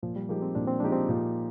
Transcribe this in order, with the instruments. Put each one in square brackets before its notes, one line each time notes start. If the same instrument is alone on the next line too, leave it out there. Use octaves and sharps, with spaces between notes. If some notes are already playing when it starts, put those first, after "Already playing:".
[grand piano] A#2 [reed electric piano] F3
[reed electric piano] G3
[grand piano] F3 G#3 D#4 G4 [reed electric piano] A#3
[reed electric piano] C4
[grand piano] A#2 [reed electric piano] D4
[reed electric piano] C4
[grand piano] F3 G#3 D#4 G4 [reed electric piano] D4
[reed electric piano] C4
[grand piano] A#2 [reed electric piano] F4